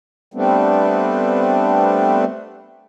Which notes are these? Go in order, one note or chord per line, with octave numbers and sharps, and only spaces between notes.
G3 A3 B3 C4 D4